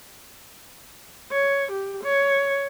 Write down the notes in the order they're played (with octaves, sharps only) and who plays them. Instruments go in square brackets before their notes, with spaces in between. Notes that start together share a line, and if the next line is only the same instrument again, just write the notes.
[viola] C#5
G4
C#5